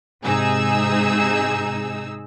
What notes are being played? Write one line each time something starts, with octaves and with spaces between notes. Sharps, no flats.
G#2 C3 D#4 G#4 E6